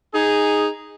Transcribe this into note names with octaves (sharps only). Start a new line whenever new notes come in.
D#4 G#4